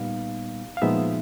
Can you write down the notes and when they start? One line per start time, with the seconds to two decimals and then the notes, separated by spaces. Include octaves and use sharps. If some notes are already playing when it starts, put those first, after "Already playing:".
Already playing: A#2 G3 B3 D#4 F5
0.77 F5
0.82 A#2 F3 G#3 B3 D#4 E5